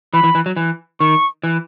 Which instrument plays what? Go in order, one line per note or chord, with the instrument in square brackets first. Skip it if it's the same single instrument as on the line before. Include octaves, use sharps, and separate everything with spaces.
[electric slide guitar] E3 [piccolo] B5
[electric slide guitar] E3
E3
F#3
E3
[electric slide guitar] D#3 [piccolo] C#6
[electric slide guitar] E3